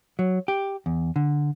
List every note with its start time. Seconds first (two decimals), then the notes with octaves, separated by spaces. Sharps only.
0.19 F#3
0.48 G4
0.86 E2
1.16 D3